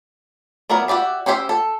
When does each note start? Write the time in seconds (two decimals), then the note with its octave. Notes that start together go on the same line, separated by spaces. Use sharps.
0.70 F#3 B3 E4 A#4 D5
0.88 F#4 G4 D5 E5
1.26 C#4 D4 G4 C5 E5
1.49 A4